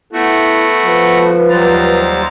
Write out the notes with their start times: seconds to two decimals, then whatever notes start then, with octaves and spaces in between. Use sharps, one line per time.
0.13 A3 B3 E4 F#4 A4
0.85 F3 B4
1.50 D#2 F#3 G3 C5 A#5 A6